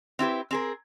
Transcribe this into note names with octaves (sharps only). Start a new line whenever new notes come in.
C4 E4 G4 B4
C4 G#4 A#4